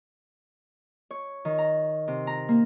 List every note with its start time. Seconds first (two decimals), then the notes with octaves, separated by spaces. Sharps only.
1.11 C#5
1.45 D#3
1.58 A#5
2.08 C3
2.27 A#5
2.49 A#3